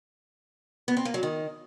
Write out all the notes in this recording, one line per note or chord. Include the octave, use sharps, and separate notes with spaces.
B3
C4
A#3
F#3
D#3